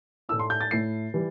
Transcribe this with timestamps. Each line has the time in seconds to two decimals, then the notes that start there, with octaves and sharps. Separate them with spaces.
0.29 A2 A3 E4 E6
0.39 C6
0.50 G6
0.61 A6
0.71 A2 A3 E4 C7
1.14 E3 G3